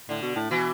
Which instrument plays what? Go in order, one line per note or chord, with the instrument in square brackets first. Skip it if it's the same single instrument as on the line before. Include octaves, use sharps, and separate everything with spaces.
[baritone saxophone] A2 [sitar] D3
[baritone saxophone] B2
A2
[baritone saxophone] B2 [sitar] E3